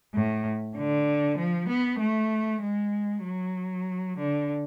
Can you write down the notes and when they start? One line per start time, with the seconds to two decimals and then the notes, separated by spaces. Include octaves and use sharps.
0.14 A2
0.77 D3
1.38 F3
1.68 B3
2.00 A3
2.62 G#3
3.24 F#3
4.17 D3